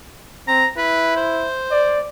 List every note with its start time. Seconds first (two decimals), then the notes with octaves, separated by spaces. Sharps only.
0.48 C4 A#5
0.77 E4 B4
1.16 C5
1.71 D5